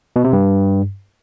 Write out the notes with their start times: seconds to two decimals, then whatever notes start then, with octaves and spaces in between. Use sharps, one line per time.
0.16 B2
0.24 C3
0.33 G2